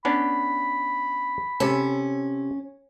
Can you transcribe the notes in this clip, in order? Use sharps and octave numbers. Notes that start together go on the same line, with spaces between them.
B3 C#4 D4 B5
C3 C#4 A4